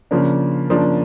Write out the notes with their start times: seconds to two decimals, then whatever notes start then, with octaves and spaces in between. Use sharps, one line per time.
0.11 C#3 F3 A#3 D4
0.70 C#3 F3 A#3 D4